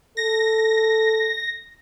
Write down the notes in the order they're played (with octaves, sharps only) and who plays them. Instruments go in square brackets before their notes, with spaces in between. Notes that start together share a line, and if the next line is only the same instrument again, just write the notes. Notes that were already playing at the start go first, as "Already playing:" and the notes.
[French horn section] A4 [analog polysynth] A#6